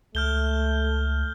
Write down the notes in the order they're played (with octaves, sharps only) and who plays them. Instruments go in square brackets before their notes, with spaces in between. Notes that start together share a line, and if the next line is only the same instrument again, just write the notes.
[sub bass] C#2 [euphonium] A3 [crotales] F6 G6 G7